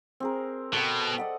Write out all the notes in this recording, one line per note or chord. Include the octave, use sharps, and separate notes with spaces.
C4 G#4 A#4
B2 A4 G5
D5 D#5 F#5